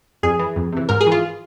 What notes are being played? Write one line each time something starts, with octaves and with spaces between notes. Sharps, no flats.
F2 G#4
E3
F2
C3 E3
G#2 A#4
G#4
E3
F4